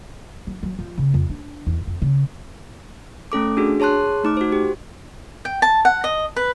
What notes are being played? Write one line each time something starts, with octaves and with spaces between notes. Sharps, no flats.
F#3
F#3
F3
C#3
F2
D4
E2
F2
C#3
A3 C#4 A4 D6
D4 F#4 G#4
G#4 C#5 A5 C6 F#6
A3 D#4 D6
F#4 C5
G4
G5
A5
F#5
D#5
B4